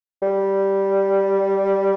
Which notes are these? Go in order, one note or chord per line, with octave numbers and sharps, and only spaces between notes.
G3